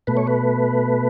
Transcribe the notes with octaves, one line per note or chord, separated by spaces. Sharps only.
B2 A3 B4
C#5
B4